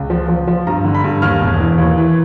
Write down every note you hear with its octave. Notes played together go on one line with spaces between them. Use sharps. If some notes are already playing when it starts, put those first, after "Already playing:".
Already playing: C#2
F3
F3
F3
G2 A#5
D3
B5
G2
D#2 F6
E1
E3
D#2
E3